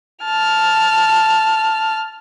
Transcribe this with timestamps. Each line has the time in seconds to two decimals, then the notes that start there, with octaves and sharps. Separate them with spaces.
0.24 A5 F6